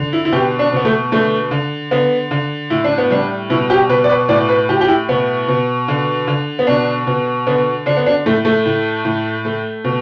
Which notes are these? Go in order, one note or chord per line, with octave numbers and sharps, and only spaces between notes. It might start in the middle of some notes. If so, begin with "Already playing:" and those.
Already playing: D3
E4
E4
B2 G4
D4
B2 B3
A3
D3 A3
D3
D3 B3
D3
A2 E4
D4
B3
G3 D4
B2 E4
G4
B2 B4
D5
B4
A2 D5
B4
A2 G4
G4
E4
B2 B3
B2
D3
D3
B3
B2 D4
B2
D3 B3
D3 D4
B3
D4
A2 A3
A3
A2
A2
A3
B2